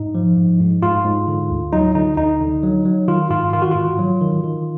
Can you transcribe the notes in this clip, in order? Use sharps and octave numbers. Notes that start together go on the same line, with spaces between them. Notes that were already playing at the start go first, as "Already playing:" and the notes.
Already playing: G#2 D#4
F3
G#2
G#2
G#2 F4
G#2
D3
D2
F#3 D#4
D3 D#4
D2 D#4
D3
F#3
F#3
D#3 F4
G#2 F4
D#3 F4
F#4
G#2 F4
F#3
D#3
D#3